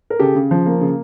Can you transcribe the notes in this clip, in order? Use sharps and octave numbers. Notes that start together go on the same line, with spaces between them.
A#4
C#3 G4 A4
C#3
F3
A#3
C#3